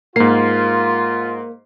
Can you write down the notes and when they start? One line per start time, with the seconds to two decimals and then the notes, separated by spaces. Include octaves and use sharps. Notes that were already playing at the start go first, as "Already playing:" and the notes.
0.16 G#2 A#3 F4 C7